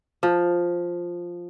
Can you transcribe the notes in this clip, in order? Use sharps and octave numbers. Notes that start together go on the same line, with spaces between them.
F3